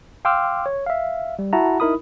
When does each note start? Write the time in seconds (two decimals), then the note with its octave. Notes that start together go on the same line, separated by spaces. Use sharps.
0.25 F5 G5 C6 D6 E6 F6
0.66 C#5
0.86 E5 F5
1.39 G3
1.53 E4 F#4 E5 F#5 A5 A#5
1.80 D#4 E4 A#4 B5 D#6